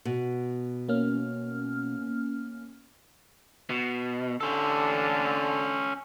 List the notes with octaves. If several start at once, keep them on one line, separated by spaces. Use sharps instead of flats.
B2
A#3 C#4 F6
B2
D3 C#4 A4